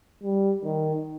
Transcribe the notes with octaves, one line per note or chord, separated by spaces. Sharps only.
G3
D#3